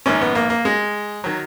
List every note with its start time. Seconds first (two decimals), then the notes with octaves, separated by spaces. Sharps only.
0.06 A#1 G#2 D#3 C#4
0.21 B3
0.35 A#3
0.50 A#3
0.65 G#3
1.24 D#3 F#3